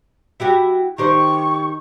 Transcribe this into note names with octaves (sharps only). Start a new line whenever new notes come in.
E4 F#4 G4
D#3 G4 C5 C#6